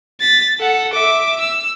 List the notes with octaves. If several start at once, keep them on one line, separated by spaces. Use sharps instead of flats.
A6 B6
A4 F#5
E5 D6
E6